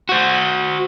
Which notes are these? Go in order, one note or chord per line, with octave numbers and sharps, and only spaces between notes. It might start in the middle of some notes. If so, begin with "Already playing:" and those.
F#4 C5